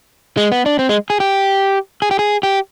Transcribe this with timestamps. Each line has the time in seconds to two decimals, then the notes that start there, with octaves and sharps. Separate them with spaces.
0.37 G#3
0.52 B3
0.66 D4
0.79 C4
0.89 G#3
1.10 G#4
1.20 G4
2.02 G#4
2.11 G4
2.19 G#4
2.43 G4